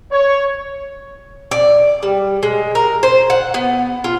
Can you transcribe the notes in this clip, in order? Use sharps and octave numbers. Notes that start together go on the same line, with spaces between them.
C#5
D5
G3
G#3
A#4
C5
F#5
B3
F4